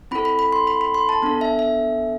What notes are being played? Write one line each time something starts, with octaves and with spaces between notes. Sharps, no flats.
C4 E4 A4 B5
B5
B5
C6
B5
B5
C6
A5
B3 D4 A4
E5
E5